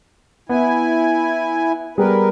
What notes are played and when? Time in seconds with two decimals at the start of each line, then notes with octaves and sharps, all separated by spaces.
0.49 B3 E4 G#5
1.98 G3 B3 G#4 A#4 B4